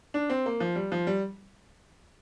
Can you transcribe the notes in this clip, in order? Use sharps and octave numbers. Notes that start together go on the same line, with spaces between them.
D4
C4
A#3
F3
G3
F3
G3